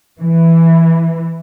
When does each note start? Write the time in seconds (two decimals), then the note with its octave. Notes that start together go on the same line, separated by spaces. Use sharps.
0.20 E3